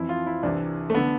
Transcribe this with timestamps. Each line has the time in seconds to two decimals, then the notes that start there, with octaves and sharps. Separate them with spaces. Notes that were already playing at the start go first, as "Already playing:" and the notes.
Already playing: F2 E3 E4
0.09 F4
0.27 E4
0.43 C2 C3 E3 D4
0.90 A3
0.95 D3 B3